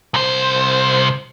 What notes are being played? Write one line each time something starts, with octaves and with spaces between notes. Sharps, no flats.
C2 C5